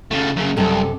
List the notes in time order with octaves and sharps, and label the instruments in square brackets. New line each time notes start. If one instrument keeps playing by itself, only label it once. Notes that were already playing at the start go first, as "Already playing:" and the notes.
[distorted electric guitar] C#3 A3
F#2 C#3
[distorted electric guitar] C2 [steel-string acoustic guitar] F#2 C3 A4